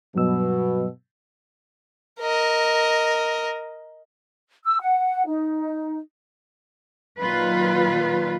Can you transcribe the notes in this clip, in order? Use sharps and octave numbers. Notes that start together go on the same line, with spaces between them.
G2 B2 F#3 E6
A#4 D#5
E6
F#5
D#4
A#2 D#3 F#3 F4 B4